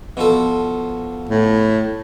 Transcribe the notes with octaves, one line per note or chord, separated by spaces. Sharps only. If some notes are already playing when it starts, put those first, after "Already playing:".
B2 F3 A4
A2